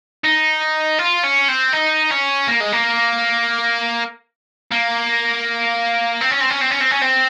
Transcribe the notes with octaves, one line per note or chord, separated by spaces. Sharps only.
D#4
F4
C#4
C4
D#4
C#4
A#3
G#3
A#3
A#3
C4
C#4
C4
C#4
C4
C#4
C4
C#4
C4